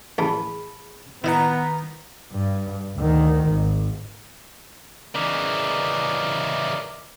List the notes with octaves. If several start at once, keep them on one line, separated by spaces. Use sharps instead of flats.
A1 E3 G#4 A5 B5
D#3 B3 E4 D#5 F#5 A#5
G2
D2 D#3
G#1
C#3 E3 A#4 D5 D#5